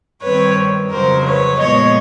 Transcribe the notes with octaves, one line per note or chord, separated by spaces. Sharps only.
G2 D#3 G3 C4 B4 C#5
F2 C#3 F#3 A#4 C5
B4 C#5
A#2 F3 G#3 B3 C#5 D#5